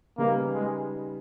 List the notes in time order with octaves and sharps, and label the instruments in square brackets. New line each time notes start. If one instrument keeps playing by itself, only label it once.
[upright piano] C#3 G3 B3 D#4 [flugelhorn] A#3
[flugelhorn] G#3